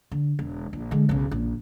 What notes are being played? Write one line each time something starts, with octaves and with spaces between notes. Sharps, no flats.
D3
E1
A#1
D3 G#3
B1 C#3
A#1